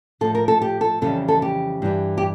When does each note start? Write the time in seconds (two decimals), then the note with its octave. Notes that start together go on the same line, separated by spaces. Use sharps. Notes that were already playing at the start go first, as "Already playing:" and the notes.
0.21 A2 F3 A4
0.35 A#4
0.48 A4
0.62 G4
0.81 A4
1.01 F2 C#3 E3 G3 A4
1.28 A4
1.42 G4
1.82 G2 E3 G3
2.18 G4